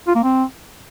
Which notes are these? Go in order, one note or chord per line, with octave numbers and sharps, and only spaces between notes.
F4
A#3
C4